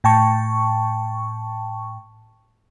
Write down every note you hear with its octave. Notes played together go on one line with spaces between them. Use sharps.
A2 G5 A5 C#6